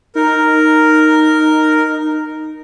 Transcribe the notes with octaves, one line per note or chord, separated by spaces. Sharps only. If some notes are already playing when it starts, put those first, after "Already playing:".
D#4 A#4